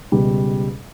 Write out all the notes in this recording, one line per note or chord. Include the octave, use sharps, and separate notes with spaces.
C#2 B2 G3